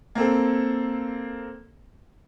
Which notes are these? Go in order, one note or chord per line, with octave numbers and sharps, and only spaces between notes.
A#3 C4 A4